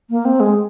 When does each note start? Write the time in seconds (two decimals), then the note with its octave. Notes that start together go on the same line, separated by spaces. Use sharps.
0.10 A#3
0.25 C4
0.40 G#3